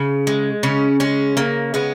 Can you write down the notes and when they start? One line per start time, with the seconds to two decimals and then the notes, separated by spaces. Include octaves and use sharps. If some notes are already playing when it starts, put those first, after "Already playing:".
Already playing: C#3
0.27 G#3
0.63 C#3 C#4
1.00 G#3 C#4
1.37 C#3 A#3
1.74 G#3 B3